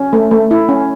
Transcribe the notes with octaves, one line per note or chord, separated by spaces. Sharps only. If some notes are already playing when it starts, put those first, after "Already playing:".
Already playing: C#4
A3
A3
E4
C#4